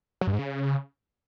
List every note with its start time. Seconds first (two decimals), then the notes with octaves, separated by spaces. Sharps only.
0.21 F#3
0.27 G2
0.33 G#2
0.39 C#3